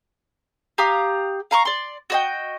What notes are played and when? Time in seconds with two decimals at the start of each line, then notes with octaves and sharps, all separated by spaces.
0.78 G4 F5 A#5 D#6
1.51 F5 A#5 C#6
1.65 D5 C6
2.10 F#4 D#5 G5